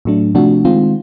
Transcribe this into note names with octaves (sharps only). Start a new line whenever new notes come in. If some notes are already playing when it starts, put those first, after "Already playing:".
A2 F#3 A3 D4
C3 F3 A3 D4 F#4
D#3 G#3 C4 F4